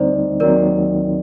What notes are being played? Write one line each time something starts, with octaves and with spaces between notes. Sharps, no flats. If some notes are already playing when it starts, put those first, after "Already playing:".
Already playing: D2 D3 G3 C4 D#4 C5 D5
D#2 D#3 F#3 C4 D#4 A#4 D5